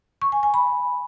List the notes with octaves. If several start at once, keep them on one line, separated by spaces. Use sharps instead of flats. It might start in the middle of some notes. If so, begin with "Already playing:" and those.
C#6
G#5
G#5
B5